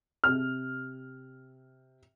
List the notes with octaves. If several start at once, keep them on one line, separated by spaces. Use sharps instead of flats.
C3 F6